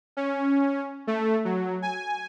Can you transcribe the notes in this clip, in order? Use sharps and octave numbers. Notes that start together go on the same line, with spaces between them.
C#4
A3
F#3
G#5